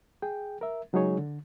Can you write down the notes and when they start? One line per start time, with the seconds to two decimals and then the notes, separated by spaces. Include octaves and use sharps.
0.22 G#4 G5
0.61 A#4 E5
0.93 C#3 F#3 G#3 D#4 G#4 C#5
1.18 D3